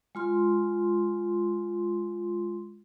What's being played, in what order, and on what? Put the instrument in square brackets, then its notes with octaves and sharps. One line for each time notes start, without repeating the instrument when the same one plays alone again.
[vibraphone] G#3 F4 C6